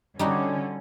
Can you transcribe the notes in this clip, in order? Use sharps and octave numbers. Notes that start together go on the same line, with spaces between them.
D3 G3 C#4 D#4 F#4